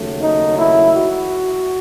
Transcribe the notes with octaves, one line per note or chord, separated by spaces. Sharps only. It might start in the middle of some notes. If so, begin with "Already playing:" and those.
Already playing: D#2 C#3 F#3 A3
D#4
E4
F#4